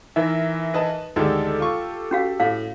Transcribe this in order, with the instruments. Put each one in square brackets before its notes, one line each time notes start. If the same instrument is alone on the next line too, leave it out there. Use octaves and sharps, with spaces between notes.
[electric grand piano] E3 A#4 E5 [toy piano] D#4
[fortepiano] B4 D#5 A5
[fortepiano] D2 D#3 G#3 [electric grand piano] G4 A4
[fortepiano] F4 C#6
[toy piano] C#4 F#4 F5
[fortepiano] A2 [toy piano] F5